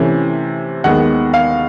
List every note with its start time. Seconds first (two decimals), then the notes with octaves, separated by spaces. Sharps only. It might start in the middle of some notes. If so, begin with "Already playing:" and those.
Already playing: C3 E3 A3 C#4
0.84 D#2 D#3 G#3 B3 F#5
1.34 F5